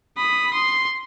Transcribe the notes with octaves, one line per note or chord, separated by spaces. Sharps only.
B5 D#6
C6